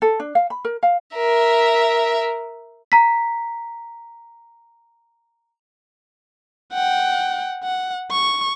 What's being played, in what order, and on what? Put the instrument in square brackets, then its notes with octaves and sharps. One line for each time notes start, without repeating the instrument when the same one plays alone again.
[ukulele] A4
D4
F5
B5
A#4
F5
[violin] A#4 E5
[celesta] A#5 B6
[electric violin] F#5 G5
F#5
C#6